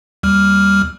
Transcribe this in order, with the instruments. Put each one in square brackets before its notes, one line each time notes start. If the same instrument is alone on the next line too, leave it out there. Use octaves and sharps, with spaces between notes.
[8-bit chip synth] D#2 G3 F6